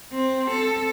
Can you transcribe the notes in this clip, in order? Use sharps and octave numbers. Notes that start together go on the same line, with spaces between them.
C4
A4